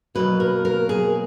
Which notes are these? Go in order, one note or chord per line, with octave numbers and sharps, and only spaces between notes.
B2 F#3 A#3 B4
A#4
A#4
G#4